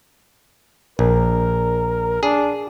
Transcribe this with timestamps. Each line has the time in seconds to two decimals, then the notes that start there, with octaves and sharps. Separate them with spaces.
0.99 A#1 A#4
2.23 D4 G#4